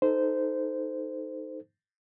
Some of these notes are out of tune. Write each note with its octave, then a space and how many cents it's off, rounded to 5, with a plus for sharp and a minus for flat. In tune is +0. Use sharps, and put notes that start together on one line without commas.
D#4 +0 A4 +0 C5 -15